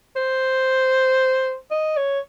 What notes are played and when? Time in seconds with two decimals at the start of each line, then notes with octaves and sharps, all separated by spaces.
0.16 C5
1.71 D#5
1.96 C#5